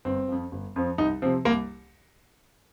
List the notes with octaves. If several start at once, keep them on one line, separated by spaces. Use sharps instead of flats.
G1 C4
F2 F3
G1
F2 F3
C2 D#4
C3 F3 C4
C2 A#3